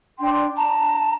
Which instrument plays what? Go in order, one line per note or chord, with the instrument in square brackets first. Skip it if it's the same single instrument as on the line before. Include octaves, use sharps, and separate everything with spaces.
[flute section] D4 G5 C6
[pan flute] A5 [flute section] A#5